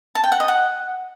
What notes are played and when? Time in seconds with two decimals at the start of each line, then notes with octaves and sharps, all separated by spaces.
0.15 A5
0.24 G5
0.32 F#5
0.40 D#5
0.48 F#5